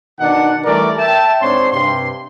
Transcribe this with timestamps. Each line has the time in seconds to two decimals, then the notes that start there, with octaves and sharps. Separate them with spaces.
0.20 B2 D#3 D4 D#4 F#5
0.65 E3 G3 A3 A#4 D5
0.98 E5 G5 A5
1.41 G#2 C4 D4 C#5 C6
1.72 G2 C3 C6